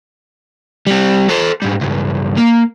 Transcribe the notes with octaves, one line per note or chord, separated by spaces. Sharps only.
G3 C4
A4 C5
G#2 G3
C#2 G2
A#3